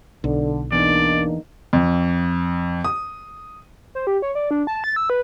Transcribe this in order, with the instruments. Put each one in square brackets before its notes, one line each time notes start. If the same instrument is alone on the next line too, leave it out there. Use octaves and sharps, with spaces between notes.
[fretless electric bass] B1 [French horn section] D3
[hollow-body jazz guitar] E2 [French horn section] A#3 D4 D#4 [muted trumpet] D5
[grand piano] F2
D#6
[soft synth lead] C5
G4
C#5
D5
D4
A5
A6
E6
B4